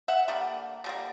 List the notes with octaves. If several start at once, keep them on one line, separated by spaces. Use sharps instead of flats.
E5 F#5
D3 G3 A#3
D3 G3 A#3